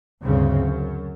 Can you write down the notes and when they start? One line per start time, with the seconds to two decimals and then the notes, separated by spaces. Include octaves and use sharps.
0.21 D2 G2 C#3 C4
0.55 F#2